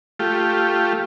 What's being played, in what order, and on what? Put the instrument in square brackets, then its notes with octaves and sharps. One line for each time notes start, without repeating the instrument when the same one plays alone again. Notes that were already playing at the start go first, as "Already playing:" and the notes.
[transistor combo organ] A3 F4 G4